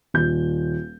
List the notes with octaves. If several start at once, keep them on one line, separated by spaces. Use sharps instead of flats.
D#1 G6